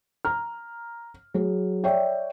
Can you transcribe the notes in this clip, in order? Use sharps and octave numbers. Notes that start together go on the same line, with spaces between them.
A#5 F6
F#3 G#4
C#5 D5 E5 G5